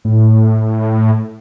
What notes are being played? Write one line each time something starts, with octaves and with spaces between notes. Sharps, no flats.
A2